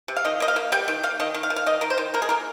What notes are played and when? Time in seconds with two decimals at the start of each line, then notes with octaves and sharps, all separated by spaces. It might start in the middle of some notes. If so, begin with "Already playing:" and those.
0.08 C3
0.17 F5
0.24 D#3 D#5
0.40 A#3 D#5
0.48 F5
0.56 A#3
0.72 G3 G5
0.88 D#3 G5
1.03 A#3 F5
1.20 D#3 D#5
1.34 D#3
1.43 F5
1.50 D#3
1.56 F5
1.66 D#3 D#5
1.81 D#3 A#4
1.90 C5
1.98 D#3
2.14 A#3 A#4
2.22 G#4
2.29 A#3 A#4